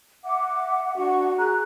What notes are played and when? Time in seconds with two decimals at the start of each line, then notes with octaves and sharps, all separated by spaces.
0.25 E5 F#5 D6
0.98 D4 F#4 F#5 C#6
1.38 G#4 A#5 F#6